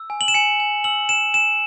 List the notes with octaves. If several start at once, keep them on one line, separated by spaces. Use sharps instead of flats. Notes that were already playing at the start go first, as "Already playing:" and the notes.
Already playing: E6
G#5
F#7
E7
G#5 C#7
G#5
E6 F#7
G#5 E7
G#5 E7